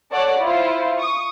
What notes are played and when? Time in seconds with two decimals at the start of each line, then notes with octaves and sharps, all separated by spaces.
0.13 A4 C#5 D5 F#5
0.42 E4 F4 C5
0.99 C#6 D#6